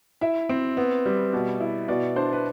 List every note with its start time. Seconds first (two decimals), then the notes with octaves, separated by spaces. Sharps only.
0.21 E4 E5
0.49 C4
0.77 B3
1.06 G3
1.33 B2
1.61 E4
1.88 B2 D5
2.16 D4 C5
2.33 B4